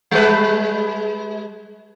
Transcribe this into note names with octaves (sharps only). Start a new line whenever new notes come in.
G3 G#3 B4